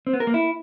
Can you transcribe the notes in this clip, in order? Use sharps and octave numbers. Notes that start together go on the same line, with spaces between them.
C4
B3
A#4
A#3
E4